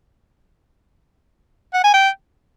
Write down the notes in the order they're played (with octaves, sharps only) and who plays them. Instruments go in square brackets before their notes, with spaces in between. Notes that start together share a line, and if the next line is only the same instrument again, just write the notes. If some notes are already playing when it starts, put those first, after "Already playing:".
[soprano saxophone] F#5
G#5
G5